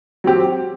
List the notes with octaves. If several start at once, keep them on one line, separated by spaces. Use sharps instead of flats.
F#3 C4 G4